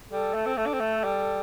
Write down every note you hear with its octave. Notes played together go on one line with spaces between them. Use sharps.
G3 A4
A3
C4
A3 A4
D4
C4
A3
G3